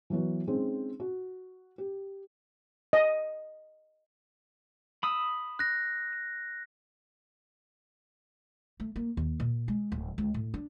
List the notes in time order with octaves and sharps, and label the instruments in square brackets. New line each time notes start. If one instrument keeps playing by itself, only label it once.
[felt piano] E3 F#3 B3 F#4
G#3 C4 C#4 D#4
F#4
G4
[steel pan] D#5
[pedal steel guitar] B5 D#6 E6
[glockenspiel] F#6 A#6
[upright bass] A3
A#3
D#2
A#2
G#3
D1
C#2
A2
D4